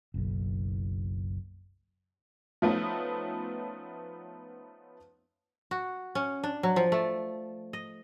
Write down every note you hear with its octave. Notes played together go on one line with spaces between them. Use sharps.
F#1 B1
F3 A3 B3 C#4 D#4
F#4
C#4
D4
F#3
F3
A3
D#5